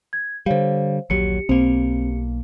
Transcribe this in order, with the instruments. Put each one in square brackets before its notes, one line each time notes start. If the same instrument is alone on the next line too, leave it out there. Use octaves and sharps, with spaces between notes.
[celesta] G#6
[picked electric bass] D3 G3 [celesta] C5 C#5 F5
[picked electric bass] D#1 A#1 F#3 [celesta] G4 C#7
[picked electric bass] B1 A#3 [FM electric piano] C4